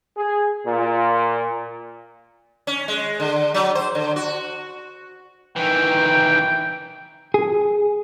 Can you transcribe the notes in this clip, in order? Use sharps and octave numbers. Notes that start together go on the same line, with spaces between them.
G#4
A#2
C#4
G#3
D3
F#3
C5
D3
F#4
D#3 E3 G5
G#4